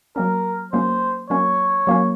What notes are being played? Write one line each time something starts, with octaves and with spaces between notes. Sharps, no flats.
F#3 A#3 C#4 A#4
F#3 A#3 C#4 C5
F#3 A#3 C#4 C#5
F#3 A#3 C#4